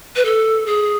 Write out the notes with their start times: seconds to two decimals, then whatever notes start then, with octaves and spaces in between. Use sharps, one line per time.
0.16 B4
0.25 A4
0.66 G#4